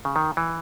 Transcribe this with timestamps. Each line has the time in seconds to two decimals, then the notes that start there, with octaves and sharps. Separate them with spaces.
0.05 C#3
0.16 D#3
0.37 E3